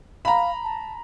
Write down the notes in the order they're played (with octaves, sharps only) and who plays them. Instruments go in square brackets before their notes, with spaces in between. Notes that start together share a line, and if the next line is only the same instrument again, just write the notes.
[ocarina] F5 [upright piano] A#5 B5
[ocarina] A5